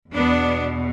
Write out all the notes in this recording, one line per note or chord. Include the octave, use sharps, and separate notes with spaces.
E2 B2 B3 D4